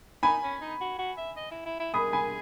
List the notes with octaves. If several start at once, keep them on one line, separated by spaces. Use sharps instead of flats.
D#4 G#5 B5
C#4
D#4
F#4
F#4
E5
D#5
E4
E4
E4
G#4 B5 D#6
G#5 B5